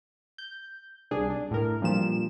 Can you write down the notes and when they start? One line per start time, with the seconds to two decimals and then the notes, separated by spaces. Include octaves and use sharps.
0.38 G6
1.11 C2 D4 G#4
1.30 D4
1.51 A2 A#4
1.81 G2 A#2 F3 E7